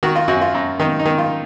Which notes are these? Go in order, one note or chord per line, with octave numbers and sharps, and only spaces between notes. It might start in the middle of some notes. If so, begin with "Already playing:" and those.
D#3 F#4
F4
F#2 F#4
F4
F#2
D#3 D#4
D#4
D#3
F4